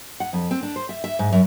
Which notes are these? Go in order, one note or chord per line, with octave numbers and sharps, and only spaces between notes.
F#5
F2
C4
D4
C5
E5
E5
G#2
F#2